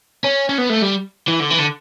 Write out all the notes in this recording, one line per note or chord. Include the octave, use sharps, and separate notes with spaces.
C#4
C#4
B3
A3
G3
E3
D3
E3
D3